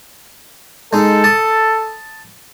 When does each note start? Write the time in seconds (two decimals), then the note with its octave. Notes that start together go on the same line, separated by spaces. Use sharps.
0.93 G#3 D#4 A4
1.24 A5 D#6